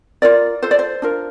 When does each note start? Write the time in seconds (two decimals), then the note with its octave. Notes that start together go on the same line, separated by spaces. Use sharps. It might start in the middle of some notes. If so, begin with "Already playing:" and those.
0.22 F4 A#4 D5
0.62 F4 A4 C5
0.71 D5
0.79 C5
1.02 D4 F4 A#4